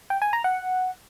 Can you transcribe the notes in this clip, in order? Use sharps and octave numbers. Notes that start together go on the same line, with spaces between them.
G5
G#5
A#5
F#5